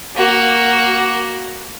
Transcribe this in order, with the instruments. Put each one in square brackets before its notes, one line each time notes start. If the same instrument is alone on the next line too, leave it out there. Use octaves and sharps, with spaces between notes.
[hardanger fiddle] A#3 F#4